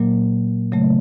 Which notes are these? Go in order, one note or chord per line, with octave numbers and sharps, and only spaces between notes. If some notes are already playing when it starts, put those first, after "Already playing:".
Already playing: A#2 F#3 A#3
C#3 F#3 A3